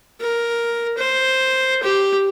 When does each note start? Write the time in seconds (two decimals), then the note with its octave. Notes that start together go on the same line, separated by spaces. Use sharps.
0.20 A#4
0.98 C5
1.83 G4